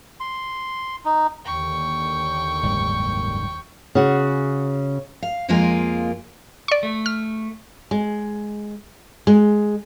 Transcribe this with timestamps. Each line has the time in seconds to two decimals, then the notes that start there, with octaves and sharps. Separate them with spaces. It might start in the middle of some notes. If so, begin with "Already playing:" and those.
0.20 C6
1.05 D#4
1.45 D#2 D3 G5 C#6
2.63 F#1 G#2 G3
3.95 C#3 F#4
5.22 F5
5.49 F2 G#3 A#3 F4 A#4 G#5
6.68 D5 C#6
6.83 A3
7.06 F6
7.91 G#3
9.27 G#3